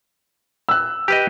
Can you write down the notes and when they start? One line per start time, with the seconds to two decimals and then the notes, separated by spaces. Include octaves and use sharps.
0.69 E6 F#6
1.08 G4 B4 D#5